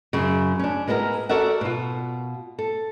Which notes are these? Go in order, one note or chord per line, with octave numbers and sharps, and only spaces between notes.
F#2 C#3
C#4 D4
G#3 B3 E4 G#4 A#4
F#4 A4 A#4 D5 E5 F#5
B2 F4
A4